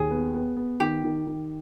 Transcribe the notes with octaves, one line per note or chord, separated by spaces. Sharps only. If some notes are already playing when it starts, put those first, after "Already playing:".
Already playing: D#2 G#4
B3
B3
B3
D#3 G4
D#3
D#3